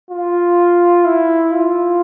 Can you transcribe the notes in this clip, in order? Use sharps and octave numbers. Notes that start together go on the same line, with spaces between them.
F4
E4
F4